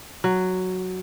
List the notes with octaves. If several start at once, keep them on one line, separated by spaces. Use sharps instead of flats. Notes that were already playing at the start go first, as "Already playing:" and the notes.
F#3